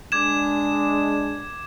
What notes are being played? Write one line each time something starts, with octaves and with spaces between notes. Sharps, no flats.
G#3 D4 D6 G#6 E7